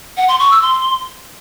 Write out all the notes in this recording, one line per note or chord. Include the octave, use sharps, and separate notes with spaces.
F#5
C6
C#6
E6
C6